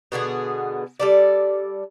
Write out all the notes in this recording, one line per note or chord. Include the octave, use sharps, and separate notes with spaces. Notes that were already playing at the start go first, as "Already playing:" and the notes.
B2 D3 B3 G#4
G3 A4 D5